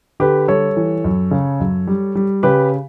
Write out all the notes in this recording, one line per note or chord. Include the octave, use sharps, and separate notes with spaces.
D3 G4 B4
G3 A4 C#5
E3
F#2
C#3
F#2
G3
G3
C#3 G4 B4